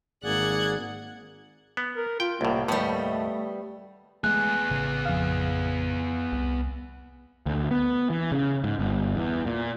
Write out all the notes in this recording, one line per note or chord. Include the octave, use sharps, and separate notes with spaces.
G#1 A#3 G#4 D5 F#5 F#6 G#6
B3
A#4
F4 G5
C2 A2 A#3
D#2 A2 G3 A3 B3
G#3 A3 B3 G#4 F#6
A1 C#3
F2 F5
C2
D2
B3
E3
C#3
G#2
G1
E2
A#2